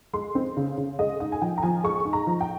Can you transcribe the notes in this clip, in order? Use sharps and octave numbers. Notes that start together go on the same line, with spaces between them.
G#3 C6
C4
C#3
C#3
G#3 D#5
D#4 D#5
G#5
F3 G5
A#5
F3 G#5
G#3 C#6
D#4
A#5
F3
G5